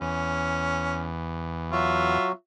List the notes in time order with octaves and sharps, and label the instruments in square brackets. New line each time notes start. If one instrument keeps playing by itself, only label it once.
[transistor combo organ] E2 [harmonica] C#4
[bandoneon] F#3 F#4 [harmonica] F4 E5